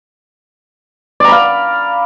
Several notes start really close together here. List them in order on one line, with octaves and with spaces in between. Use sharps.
D5 A#5 B5 F5